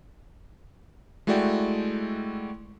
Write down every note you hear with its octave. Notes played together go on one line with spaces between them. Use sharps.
G#3 A3 E4 F#4 D5 G5